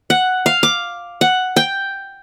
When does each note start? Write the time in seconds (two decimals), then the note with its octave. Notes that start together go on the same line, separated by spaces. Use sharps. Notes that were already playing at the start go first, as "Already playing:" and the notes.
0.10 F#5
0.46 F5
0.63 D6
1.21 F#5
1.56 G5